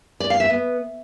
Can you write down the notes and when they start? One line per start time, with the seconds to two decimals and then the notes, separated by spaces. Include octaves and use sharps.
0.20 D5
0.30 F5
0.40 E5
0.50 B3